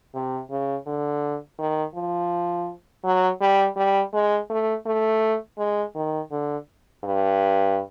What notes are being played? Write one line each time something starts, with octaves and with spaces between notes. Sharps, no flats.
C3
C#3
D3
D#3
F3
F#3
G3
G3
G#3
A3
A3
G#3
D#3
D3
G2